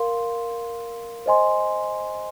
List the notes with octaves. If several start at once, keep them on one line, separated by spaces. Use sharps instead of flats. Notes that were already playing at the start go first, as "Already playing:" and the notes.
Already playing: A#4 F5 C6
C5 D#5 G#5 C6